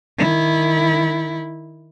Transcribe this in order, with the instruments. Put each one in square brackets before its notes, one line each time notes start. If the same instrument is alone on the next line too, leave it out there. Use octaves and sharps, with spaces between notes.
[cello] D#3 E4